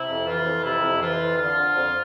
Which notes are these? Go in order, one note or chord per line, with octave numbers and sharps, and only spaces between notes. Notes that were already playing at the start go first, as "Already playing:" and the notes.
Already playing: C3 E4
F2
E3 F4
F2
C3 E4
F2
E3 F4
F2
D3 F4
D3
F2